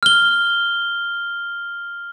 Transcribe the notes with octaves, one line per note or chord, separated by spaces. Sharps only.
F6 G7